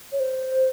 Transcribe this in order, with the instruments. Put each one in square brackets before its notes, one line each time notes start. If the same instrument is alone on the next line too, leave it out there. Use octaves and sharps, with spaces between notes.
[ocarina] C#5
C5